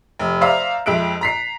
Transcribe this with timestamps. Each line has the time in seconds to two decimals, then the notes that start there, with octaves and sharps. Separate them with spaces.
0.19 F1
0.41 C5 D5 E5 F5 A#5
0.86 F2 G#3 E5 F#6 D7
1.21 A#5 B6 C7